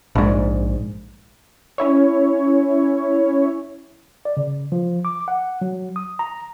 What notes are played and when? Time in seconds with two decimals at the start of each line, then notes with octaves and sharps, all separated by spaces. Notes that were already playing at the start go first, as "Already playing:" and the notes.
0.15 A#1 G#2
1.78 C#4 E4 C#5
4.25 D5
4.37 C#3
4.72 F3
5.05 D6
5.28 F#5
5.62 F#3
5.96 D#6
6.19 A#5